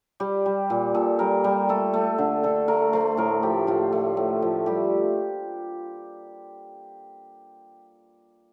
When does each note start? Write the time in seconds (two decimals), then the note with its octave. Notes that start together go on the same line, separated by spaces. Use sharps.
0.20 G3 G4
0.46 G3
0.70 A#2
0.94 A#2 A4
1.19 G3 A#4
1.44 G3 A#4
1.69 A3 A4
1.94 A3
2.18 D3
2.43 D3 A4
2.68 A3 A#4
2.93 A3 C5
3.17 A2 A#4
3.43 F3 G4
3.67 A2 F4
3.93 A3
4.17 A2
4.42 F3
4.66 G3 G4